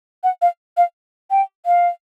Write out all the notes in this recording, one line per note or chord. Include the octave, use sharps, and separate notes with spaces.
F#5
F5
F5
G5
F5